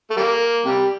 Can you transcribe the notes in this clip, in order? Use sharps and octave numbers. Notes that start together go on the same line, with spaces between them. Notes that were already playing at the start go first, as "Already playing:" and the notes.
A3
G3 A#3
C3 G3